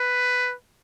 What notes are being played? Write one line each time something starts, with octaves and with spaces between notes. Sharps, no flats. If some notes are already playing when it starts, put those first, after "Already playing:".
Already playing: B4